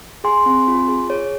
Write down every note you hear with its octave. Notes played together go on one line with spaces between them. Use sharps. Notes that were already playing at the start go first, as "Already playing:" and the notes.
G#4 G#5 C6
C4
F4
G#4
G#4 C#5